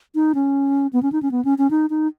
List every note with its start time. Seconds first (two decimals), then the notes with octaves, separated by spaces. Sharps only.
0.15 D#4
0.35 C#4
0.93 B3
1.03 C#4
1.12 D#4
1.22 C#4
1.31 B3
1.45 C#4
1.58 C#4
1.71 D#4
1.90 D#4